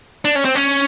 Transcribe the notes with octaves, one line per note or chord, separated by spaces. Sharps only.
D4
C#4
C4
C#4